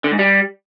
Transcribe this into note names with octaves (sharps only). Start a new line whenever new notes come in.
D3
G#2
G3